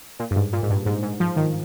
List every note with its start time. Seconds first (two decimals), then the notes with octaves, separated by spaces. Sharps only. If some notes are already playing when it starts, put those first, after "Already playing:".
0.19 A#2
0.31 G2
0.36 G#2
0.53 A#2
0.63 G#2
0.70 G2
0.86 G#2
1.02 G#2
1.20 F3
1.36 D#3